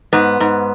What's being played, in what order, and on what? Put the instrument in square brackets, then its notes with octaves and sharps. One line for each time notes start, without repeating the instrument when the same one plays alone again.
[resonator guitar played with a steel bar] G#2 B3
G#2